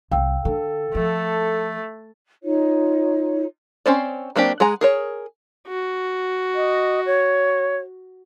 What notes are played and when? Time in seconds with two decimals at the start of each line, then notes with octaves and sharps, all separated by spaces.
0.11 C2 F5 G5 E6
0.45 D3 A4
0.95 F3 A3
2.43 D#4 F4 C#5
3.86 C4 C#4 C5 D5
4.36 F#3 A#3 C4 D4 G4
4.60 G#3 G#4 F#5 A#5
4.81 G#4 A#4 C#5
5.68 F#4
6.55 D#5
7.06 C#5